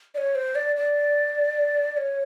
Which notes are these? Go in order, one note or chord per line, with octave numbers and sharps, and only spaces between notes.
D5
C#5
C5
D5
D5
C#5